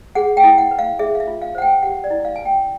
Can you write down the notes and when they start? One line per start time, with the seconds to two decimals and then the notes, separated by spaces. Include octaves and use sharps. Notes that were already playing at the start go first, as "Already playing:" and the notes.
0.15 G#4 F#5
0.37 G5
0.44 E4
0.58 F#5
0.71 B4
0.79 F5
0.99 G#4 E5
1.15 F5
1.20 E5
1.27 F4
1.42 F5
1.55 C5 F#5
1.62 G5
1.83 G4 F#5
2.04 D5
2.10 E4
2.25 F5
2.36 B4 G#5
2.45 G5